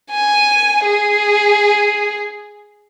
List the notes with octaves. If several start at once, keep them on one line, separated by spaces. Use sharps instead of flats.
G#5
G#4